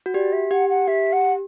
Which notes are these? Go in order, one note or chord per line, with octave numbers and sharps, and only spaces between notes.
F#4
G4 D5
E5
G4 F#5
F#5
G4 E5
F#5